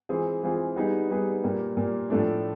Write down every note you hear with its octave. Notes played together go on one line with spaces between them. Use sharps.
E3 G#3 C4 F4 G#4
E3 G#3 C4 F4 G#4
G3 B3 D#4 G#4 B4
G3 B3 D#4 G#4 B4
A#2 G3 A#3
A#2 G3 A#3
A2 F3 A3 D4